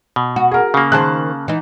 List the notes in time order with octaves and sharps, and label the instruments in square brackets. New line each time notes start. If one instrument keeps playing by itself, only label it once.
[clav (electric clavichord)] B2
[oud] F#4
[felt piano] G#4 A#4
[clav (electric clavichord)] C#3 A#3
[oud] D#3 G#4 C5 [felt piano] A5 F#6
[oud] E3 D#4